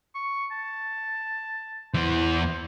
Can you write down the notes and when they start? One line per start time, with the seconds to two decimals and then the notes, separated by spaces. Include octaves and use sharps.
0.15 C#6
0.51 A5
1.95 E2 E3 C5